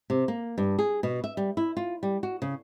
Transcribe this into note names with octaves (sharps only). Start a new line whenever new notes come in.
C3
A#3
G2
G#4
B2
E5
G3
E4
F4
G3
F#4
C#3